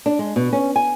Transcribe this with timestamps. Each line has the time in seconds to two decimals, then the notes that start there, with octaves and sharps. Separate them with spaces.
0.06 D4
0.19 G#3
0.36 B2
0.53 C#4
0.76 G#5